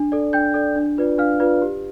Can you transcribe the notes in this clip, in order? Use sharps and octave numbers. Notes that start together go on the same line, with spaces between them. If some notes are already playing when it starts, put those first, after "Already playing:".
Already playing: D4
A4 D5
D4 G5 G6
A4 D5
D4
F4 B4 D5
D4 F5 F6
F4 B4 D5
G4